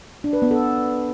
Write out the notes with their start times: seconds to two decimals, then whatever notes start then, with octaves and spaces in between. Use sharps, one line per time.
0.24 D4
0.33 B4
0.42 B3
0.51 A4